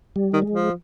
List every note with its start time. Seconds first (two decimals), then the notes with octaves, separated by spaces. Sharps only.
0.16 G3
0.34 D#3
0.42 G#3
0.52 F3